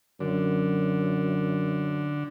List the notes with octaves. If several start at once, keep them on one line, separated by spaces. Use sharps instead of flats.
F#2 D3